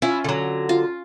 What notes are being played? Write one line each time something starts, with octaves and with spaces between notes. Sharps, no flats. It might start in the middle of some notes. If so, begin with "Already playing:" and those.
C#4 E4 F4
D3 F#3
F4